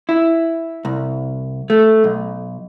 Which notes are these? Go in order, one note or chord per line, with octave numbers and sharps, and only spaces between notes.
E4
C2
A3
B1